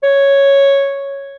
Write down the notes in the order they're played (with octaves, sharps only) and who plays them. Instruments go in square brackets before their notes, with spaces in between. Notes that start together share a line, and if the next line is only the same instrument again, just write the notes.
[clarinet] C#5